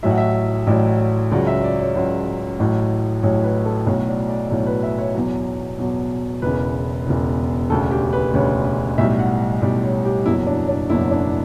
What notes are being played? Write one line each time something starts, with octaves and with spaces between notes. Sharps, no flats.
A1 A2 F#3 E5
F#5
E5
A1 A2 F#3 D5
C#2 C#3 F#3 D5
E5
D5
C#5
C#2 C#3 F#3
A1 A2 F#3
A1 A2 F#3 C#5
B4
A4
B1 A2 F#3 C#5
D5
D5
B1 A2 F#3 C#5
B4
E5
C#5
E2 B2 F#3
E2 B2 F#3
E1 E2 C#3 B4
E1 E2 C#3
E1 D2 C#3 A4
G4
B4
E1 D2 C#3 C#5
B1 A2 G3 E5
F#5
B1 A2 G3 D5
C#5
G4
F#1 E2 B2 F#3 E4
D4
D4
F#1 E2 B2 F#3 E4
C#4
D4